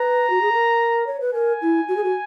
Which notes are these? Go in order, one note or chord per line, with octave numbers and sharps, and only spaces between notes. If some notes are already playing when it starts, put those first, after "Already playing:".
Already playing: B4 A#5
F#4
G#4
A#4
C#5
B4
A#4 G#5
E4
F#4
G#4
F#4